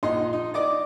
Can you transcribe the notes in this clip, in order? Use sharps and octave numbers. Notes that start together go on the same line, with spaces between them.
A#1 D#4 D#5 C6
D#4
D5 D#5 D6